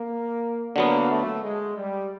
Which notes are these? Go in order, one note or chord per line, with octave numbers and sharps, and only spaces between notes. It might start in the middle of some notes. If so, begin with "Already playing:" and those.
Already playing: A#3
D3 F#3 A#3 B3
A3
G#3
G3